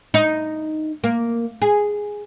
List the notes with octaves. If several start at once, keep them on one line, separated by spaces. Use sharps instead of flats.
D#4
A#3
G#4